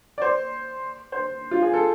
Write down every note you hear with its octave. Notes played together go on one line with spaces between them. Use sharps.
D5
C5
C5
F4
G#4
A4